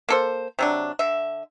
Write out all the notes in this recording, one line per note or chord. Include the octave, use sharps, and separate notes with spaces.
A#3 A4 C5
C3 F#3 D4
D3 E5